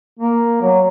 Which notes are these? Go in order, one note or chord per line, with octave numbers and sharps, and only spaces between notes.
A#3
F#3